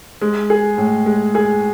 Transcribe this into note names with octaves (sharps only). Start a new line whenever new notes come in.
G#3
G#4
A2
G#3
G#4